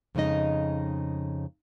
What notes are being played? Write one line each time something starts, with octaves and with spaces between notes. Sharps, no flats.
F2 C#3 G#3 D#4 D#5